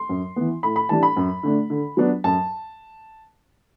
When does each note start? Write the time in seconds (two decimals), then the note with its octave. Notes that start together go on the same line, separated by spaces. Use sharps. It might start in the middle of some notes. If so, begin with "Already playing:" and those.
Already playing: C6
0.09 F#2
0.36 E3 B3
0.63 A2 B5
0.76 B5
0.89 E3 G3 D4 A5
1.03 B5
1.16 F#2
1.43 D3 A3 D4
1.70 D3
1.97 F#3 B3 D4
2.24 F#2 A5